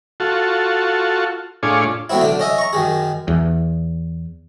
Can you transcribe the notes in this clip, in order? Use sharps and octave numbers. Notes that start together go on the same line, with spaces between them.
F4 F#4 A4
A2 D4 F4 G#4 C#5
F#3 A3 B3 C4 E4
B1 D3 D4
C#4 D#5 E5
A#5 C#6
F#2 D#3 G#4
E2